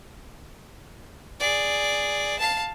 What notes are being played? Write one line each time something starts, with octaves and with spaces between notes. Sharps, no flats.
G#4 D5
F5 A5